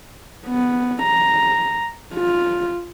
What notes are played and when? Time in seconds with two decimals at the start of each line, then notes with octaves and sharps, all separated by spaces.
0.47 B3
1.03 A#5
2.15 F4